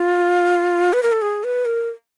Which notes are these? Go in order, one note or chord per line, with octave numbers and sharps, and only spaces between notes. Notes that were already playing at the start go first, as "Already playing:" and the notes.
Already playing: F4
B4
A#4
A4
G#4
B4
A#4